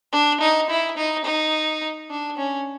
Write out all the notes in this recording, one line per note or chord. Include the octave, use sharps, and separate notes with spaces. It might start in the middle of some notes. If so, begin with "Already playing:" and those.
D4
D#4
E4
D#4
D#4
D4
C#4